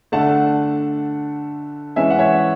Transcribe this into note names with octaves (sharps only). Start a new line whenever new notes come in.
D3 A3 D4 F#5 A5
E3 G#3 C#4 E5 G#5
F#5
C#5 E5